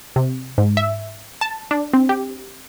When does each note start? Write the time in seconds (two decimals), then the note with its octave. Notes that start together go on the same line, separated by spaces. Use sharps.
0.16 C3
0.58 G#2
0.77 E5
1.41 A5
1.71 D4
1.93 C4
2.09 G4